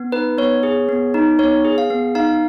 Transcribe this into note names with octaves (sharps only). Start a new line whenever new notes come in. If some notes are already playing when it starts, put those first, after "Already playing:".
Already playing: B3
D#4 B4
B3 C#5
G#4
B3
D#4
B3 C#5
G#4
F5
B3
D#4 F5